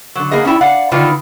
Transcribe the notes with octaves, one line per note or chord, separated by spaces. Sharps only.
D3 F#3
A#3 B3 G#4 D#5
C#4 D4 E4 G5
D5 F5 F#5
D3 D#3 B3 D4 F4 B4